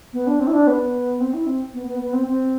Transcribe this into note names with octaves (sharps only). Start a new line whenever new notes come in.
B3
D4
C4
E4
D4
B3
C4
E4
C4
B3
B3
B3
C4
C4